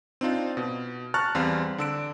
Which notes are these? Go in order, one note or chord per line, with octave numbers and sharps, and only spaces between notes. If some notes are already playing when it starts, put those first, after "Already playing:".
C4 D4 D#4 F4
B2
A5 A#5 C#6 F6 F#6 A6
E2 G3 C4 F5 C6
D3 E6 D7